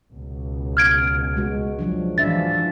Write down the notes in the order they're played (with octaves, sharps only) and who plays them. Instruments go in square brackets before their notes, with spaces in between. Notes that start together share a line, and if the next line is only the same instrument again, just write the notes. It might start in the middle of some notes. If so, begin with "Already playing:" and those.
[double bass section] C#2 B2
[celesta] F6 G#6 D7
[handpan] G#3 F#4
F3 F#3 D4
[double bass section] G#2 E3 F3 [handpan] D4 F4 E5 [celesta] A6